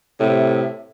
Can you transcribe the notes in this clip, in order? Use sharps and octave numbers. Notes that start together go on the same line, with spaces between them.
A2 C3 E5